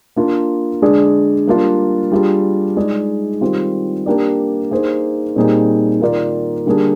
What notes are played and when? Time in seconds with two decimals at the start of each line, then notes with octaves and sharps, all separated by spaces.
0.16 A#3 D4 F4
0.82 D3 G#3 D4 G#4 D5
1.47 G3 A#3 D4 F4
2.12 G3 D4 F4 G#4
2.77 G#3 D#4 G#4 D5
3.41 D#3 G3 C4 F4
4.06 A#3 D4 G4 A#4 D5
4.71 A#3 D#4 G#4 C5
5.36 A#2 G3 C4 D#4 G#4
6.01 D#3 A#3 F4 A#4 D5
6.66 D3 G3 A#3 D4 G#4